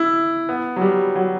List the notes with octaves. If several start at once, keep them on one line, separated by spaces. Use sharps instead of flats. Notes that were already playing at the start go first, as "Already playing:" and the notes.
Already playing: E4
B3
F#3
G3
F#3